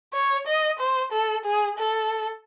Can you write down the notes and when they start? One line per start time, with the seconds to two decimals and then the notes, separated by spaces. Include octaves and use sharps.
0.14 C#5
0.47 D#5
0.79 C5
1.12 A4
1.45 G#4
1.79 A4